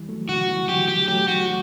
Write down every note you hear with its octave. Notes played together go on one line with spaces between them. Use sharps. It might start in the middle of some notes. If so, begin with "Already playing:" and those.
Already playing: E3 G3
F#3 A3
B2 D3 F#4
C#3 E3
D3 F#3 G4
G4
F#3 A3 G4
F#4